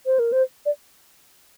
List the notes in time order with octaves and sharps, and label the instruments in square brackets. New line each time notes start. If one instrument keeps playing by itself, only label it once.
[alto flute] C5
A#4
C5
D5